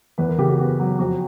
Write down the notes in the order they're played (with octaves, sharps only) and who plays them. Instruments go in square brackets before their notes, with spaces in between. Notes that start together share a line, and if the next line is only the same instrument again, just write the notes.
[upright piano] E2 B4
A#4
C#3 G4
F#4
G4
B3 F#4
F#3
F2 F#4